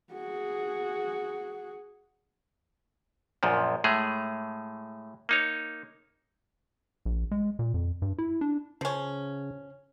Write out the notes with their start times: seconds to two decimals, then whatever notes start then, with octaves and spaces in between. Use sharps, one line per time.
0.13 F#4 G#4
3.43 A#1 F#2 A#2 F3
3.84 A2 G#3 A3 G#4
5.29 A#3 D#4 C#5
7.05 A#1
7.31 G#3
7.59 A#2
7.74 F2
8.02 G2
8.18 E4
8.41 D4
8.81 C#3 F3 C#4